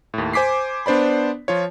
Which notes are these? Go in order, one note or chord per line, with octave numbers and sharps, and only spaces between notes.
D#2 A2
C5 G#5 D6 B6 C7
B3 D4 C5 D5 B5
F3 F4 C#5